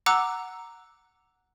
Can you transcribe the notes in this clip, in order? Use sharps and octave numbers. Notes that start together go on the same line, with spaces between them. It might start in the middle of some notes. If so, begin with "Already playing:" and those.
F#5 A#5 D6 E6 F#6